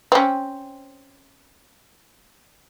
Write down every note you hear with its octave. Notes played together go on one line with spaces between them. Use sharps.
C4 C#4